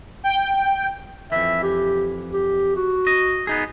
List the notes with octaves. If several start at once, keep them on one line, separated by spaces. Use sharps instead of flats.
G5
F2 E3 E5
G4
G4
F#4
D#5
B3 D#4 G#4